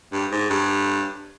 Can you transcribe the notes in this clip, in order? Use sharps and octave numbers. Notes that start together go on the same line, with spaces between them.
G2
G#2
G2